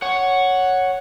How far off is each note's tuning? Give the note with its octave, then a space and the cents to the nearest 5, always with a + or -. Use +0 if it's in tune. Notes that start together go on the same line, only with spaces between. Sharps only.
C#5 +0 F#5 +0